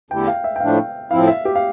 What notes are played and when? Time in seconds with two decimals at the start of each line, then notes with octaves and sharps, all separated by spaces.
0.10 E2 D3 A3 E4 G4 G5
0.27 F5
0.44 E5
0.56 G5
0.60 A2 F3 A3 D4 F5
1.11 A2 F3 C4 E4 F5
1.28 E5
1.45 G4
1.55 F5